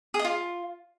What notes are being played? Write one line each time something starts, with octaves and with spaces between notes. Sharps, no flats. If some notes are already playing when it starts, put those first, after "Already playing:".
G#4
D#5
F4